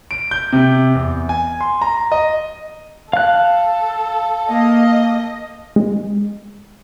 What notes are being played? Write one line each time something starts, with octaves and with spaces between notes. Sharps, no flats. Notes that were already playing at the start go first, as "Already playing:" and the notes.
D7
G6
C3
E2
G#5
C6
A#5
D#5
A4 F5 F#6
A#3 D#5
G#3